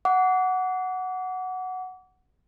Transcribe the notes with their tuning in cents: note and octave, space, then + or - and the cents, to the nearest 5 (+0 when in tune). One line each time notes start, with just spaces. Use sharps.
F#5 +0 D6 -35